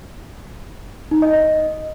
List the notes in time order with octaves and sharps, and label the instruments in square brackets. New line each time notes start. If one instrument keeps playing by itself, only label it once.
[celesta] D#4
D#5
D#5